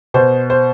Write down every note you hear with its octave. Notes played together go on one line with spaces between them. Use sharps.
B2 C5
C5